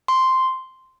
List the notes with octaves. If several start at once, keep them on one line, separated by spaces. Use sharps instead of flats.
C6